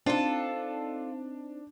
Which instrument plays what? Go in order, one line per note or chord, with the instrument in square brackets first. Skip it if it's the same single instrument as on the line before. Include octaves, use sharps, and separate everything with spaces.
[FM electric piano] C4 D#4 [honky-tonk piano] D4 [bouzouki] F4 A4